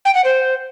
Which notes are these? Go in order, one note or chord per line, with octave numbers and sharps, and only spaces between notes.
G5
F#5
C5